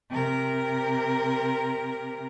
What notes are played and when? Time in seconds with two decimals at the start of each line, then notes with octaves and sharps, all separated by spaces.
0.10 C3 A#4